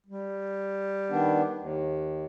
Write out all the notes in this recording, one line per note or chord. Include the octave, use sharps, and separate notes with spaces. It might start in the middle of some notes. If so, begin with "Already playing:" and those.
G3
D#3 B3 D4
D#2